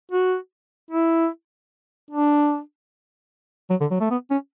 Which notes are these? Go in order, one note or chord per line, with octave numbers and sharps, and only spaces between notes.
F#4
E4
D4
F#3
D3
F#3
A3
B3
C#4